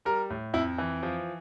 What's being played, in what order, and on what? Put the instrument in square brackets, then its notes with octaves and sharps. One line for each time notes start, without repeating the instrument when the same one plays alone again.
[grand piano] G3 A#4
A2
F2 E4
E3
F3